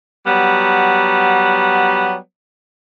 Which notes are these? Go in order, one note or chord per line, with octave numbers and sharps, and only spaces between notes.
F#3 G3 B3